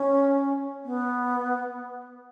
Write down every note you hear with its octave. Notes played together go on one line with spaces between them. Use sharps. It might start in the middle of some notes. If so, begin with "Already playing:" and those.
Already playing: C#4
B3